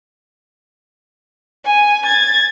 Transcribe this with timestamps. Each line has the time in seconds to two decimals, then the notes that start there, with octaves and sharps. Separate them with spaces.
1.65 G#5
2.05 G#6 A6